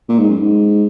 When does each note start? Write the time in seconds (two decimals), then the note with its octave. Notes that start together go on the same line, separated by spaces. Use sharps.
0.09 A#2
0.19 G#2
0.29 F#2
0.40 G#2